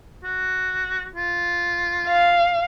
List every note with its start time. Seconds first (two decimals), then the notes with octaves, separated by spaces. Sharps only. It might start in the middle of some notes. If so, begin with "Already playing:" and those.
0.24 F#4
1.15 F4
2.08 F5